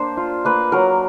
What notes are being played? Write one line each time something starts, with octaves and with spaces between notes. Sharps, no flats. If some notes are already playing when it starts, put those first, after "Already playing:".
Already playing: A#3 D4 C5
F4
A#3 B4
F#3 A#4